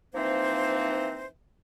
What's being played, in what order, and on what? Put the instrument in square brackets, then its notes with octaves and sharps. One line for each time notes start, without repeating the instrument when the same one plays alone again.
[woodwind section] E3 F3 A#3 C4 D#4 C5